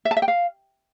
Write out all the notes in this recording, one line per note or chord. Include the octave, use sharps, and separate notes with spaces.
E5
A5
E5
G5
F5